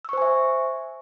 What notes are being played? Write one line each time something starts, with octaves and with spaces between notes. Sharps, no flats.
C5 E5 G#5 C#6 E6